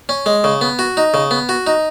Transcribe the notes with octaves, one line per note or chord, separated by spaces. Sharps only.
C#4
G#3
C#3
B3
F#4
D#4
C#3
B3
F#4
D#4